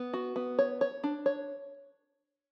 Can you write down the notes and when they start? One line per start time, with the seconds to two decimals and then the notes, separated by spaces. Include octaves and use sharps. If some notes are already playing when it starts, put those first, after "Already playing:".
Already playing: B3
0.13 F#4
0.36 B3
0.59 C#5
0.81 C#5
1.04 D4
1.26 C#5